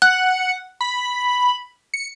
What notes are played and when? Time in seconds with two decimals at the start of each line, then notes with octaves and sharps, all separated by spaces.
0.02 F#5 F#6
0.81 B5
1.94 C#7